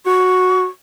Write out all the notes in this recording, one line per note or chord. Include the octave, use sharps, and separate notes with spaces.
F#4 C#6